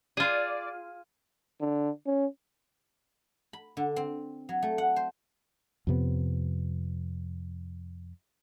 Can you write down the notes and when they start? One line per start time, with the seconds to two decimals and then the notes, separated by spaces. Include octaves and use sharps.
0.17 F4 G#4 D5
1.61 D3
2.06 C#4
3.53 B5
3.77 D3
3.96 C4
4.49 F#3
4.62 A3
4.78 F#5
4.96 C5
5.87 F2 C3 B3